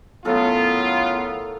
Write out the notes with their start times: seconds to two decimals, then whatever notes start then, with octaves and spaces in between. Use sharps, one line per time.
0.25 A2 C#3 F#3 B3 F4 A4 A#4